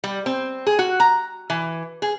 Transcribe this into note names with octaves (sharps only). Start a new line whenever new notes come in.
G3
C4
G#4
F#4
A#5
E3
G#4